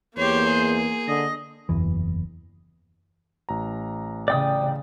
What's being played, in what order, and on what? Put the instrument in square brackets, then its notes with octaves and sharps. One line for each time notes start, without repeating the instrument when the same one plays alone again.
[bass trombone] E2 [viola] A#3 [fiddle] G4 C#5 [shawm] C5
[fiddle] G#4
[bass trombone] D3 [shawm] D#5
[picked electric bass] F#1 E2 E3
[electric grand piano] A1 A#5
[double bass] C#3 [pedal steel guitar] D5 G5 D#6